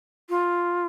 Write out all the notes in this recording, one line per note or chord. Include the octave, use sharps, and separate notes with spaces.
F4